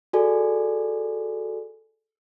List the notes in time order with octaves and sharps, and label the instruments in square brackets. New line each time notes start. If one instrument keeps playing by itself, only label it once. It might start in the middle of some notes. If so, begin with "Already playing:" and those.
[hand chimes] F#4 G#4 A4 D5 G#5